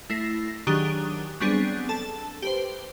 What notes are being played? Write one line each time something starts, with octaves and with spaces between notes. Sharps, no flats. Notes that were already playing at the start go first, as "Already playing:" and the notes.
A3 E4 A#6 C7
D#3 F#3 D4 G4 G#4
F#3 G3 B3 C4 D4 G#4
A4 A5
G4 B4 C5